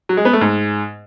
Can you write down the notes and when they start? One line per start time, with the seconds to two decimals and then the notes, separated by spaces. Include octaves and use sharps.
0.09 F#3
0.17 G#3
0.25 B3
0.33 A3
0.41 G#2